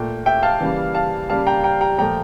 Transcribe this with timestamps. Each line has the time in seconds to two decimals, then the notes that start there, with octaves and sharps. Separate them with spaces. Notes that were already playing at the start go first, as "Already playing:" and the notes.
Already playing: A#2 A3 G5
0.26 E5 G5
0.43 F5 A5
0.60 C#3 E3 G3 A#3
0.95 F5 A5
1.29 C#3 G3 A#3 F5 A5
1.47 G5 A#5
1.64 G5 A#5
1.81 G5 A#5
1.98 A#2 F3 A3 G5 A#5